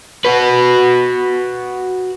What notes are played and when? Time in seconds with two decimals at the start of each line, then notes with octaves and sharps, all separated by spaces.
0.25 F#4 B4